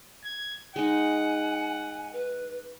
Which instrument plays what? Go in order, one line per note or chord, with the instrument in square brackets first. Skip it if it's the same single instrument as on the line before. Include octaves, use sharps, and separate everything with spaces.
[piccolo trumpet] G#6
[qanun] G#3 D#4 [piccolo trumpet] F#5 [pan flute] G#5
[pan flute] B4